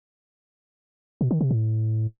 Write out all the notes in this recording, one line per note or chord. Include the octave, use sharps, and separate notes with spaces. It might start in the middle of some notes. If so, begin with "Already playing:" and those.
B2
D#3
C3
A2